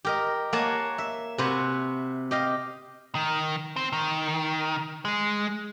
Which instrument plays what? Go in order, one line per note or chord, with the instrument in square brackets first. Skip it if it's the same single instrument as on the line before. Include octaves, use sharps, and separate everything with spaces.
[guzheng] G4 A#4 D#5
A#3 C#5 F#5 G#5 A5
E5
C3 F#4 B4 C5 G#5
G4 D#5 F5
[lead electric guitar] D#3
C4
D#3
G#3